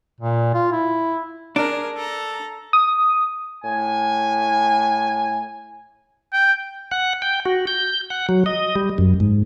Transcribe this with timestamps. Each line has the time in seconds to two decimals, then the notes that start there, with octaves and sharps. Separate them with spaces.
0.20 A#2
0.54 F4
0.72 E4
1.56 D4 G#4 A#4
1.95 A4 A#5
2.73 D#6
3.64 A2 G#5
6.33 G5
6.91 F#5
7.22 G5
7.45 F#4
7.67 G6
8.10 F#5
8.29 F#3
8.46 D#5
8.76 G3
8.98 F#2
9.20 G#2